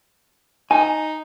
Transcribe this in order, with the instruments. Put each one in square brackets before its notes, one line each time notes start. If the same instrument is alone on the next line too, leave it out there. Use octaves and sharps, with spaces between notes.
[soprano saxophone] D#4 [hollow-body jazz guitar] G#5